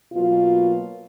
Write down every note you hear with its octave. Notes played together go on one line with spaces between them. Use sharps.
B2 F#3 A#3 F4